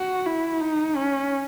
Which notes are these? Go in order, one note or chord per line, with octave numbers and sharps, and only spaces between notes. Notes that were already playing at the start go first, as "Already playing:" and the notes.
Already playing: F#4
E4
D#4
C#4